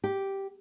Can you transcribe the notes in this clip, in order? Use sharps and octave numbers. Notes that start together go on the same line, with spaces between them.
G4